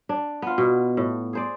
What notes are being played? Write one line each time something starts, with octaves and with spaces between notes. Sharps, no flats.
D4
B3 F4
B2
A2
G#4 C5 D5